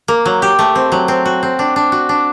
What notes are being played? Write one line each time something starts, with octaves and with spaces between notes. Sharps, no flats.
A#3
F#3
G4
A3
C4
F#3
C4
F#4
C4
D4
D4
F#4
D4